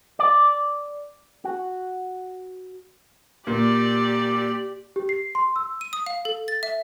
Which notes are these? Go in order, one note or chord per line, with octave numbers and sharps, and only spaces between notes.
D5
F#4
A#2 G4 D5
G4
C7
C6
E6
D#7
D#6
F5
A4
A6
E5